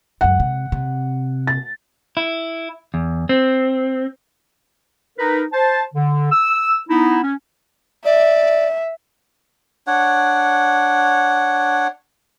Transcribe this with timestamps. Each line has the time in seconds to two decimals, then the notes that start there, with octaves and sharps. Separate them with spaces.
0.21 C#2 F#2 F#5
0.40 C3
0.72 C3
1.47 A6
2.17 E4
2.94 E2
3.29 C4
5.18 D#4 A#4 B4
5.52 C5 A5
5.95 D3
6.32 E6
6.89 B3 D#4 E4
7.23 C#4
8.05 D5 E5
9.87 D4 C#5 F#5